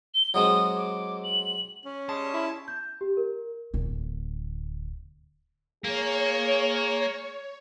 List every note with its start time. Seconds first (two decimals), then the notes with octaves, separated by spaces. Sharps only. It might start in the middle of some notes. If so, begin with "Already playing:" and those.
0.14 G7
0.34 F#3 G#3 C4 D#6
0.76 D6
1.24 F#7
1.85 C#4
2.09 C#3 G3 G#3 A5
2.34 E4
2.68 G6
3.01 G4
3.17 A#4
3.74 D1 D2
5.84 A#3 G#4 A#4 C#5